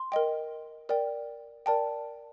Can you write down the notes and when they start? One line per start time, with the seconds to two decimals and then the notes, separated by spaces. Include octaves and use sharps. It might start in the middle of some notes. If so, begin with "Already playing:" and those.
Already playing: C6
0.12 A#4 D#5 G5
0.89 A#4 D5 G5
1.66 A#4 D5 G5 A5